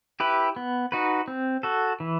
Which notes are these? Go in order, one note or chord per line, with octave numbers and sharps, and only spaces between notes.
E4 G4 B4
B3
D#4 F#4 B4
C4
F#4 A4
E3